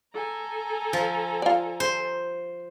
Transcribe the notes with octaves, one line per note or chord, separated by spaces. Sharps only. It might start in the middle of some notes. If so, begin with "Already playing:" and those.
A4 G#5 A#5
F3
F4 D5
C5